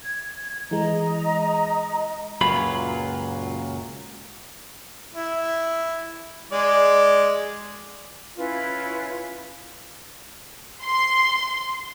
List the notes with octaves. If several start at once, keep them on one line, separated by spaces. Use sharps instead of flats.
G#6
E3 G#3 D#5 A#5
C#2 F#2 A#2 F#3 F4 B5
E4
G#3 D5
C#4 E4 F4 B4
C6